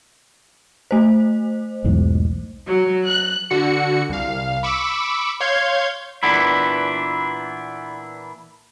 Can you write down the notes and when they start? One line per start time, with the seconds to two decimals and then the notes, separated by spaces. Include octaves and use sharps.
0.91 A3 C5
1.84 B1 E2 G#2
2.67 F#3
3.06 F#6
3.50 D3 F#4 C#7
4.09 C2 F5
4.63 B5 C#6 D6 E6
5.40 C#5 F5 C6 G6 G#6
6.23 A#2 E3 B3 D4 E4